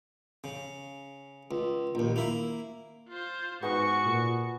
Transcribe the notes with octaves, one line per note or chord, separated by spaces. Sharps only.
C#3
C#2
A#1 D#2
A#3 E4
F4 C5
G#2 B3 F#4 G#5 C#6 D#6
A#2